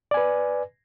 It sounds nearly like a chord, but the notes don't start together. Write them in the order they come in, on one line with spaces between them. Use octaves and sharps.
D5 G#5 B4